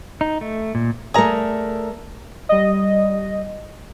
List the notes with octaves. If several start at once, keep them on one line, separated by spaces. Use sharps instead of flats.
D#4
A3
A#2
A3 G#4 A#4 D5 A#5
G3 D#5